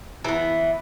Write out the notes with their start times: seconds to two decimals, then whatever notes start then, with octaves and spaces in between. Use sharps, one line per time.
0.24 E3 B3